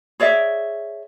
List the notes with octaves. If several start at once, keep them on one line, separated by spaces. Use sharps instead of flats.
G#4 C#5 D5 E5